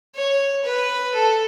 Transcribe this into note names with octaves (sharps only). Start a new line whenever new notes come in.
C#5
B4
A4